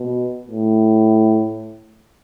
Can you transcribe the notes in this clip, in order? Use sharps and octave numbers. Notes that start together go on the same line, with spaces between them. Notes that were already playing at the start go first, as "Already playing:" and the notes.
Already playing: B2
A2